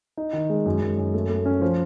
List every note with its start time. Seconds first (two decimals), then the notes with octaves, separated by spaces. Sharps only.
0.17 D#4
0.33 D#3
0.50 G#3
0.66 F#2
0.82 F#2
0.98 F#2
1.14 A3
1.29 A3
1.46 C#4
1.61 F3